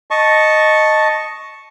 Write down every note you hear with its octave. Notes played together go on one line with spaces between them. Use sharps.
D#5 A5 C#6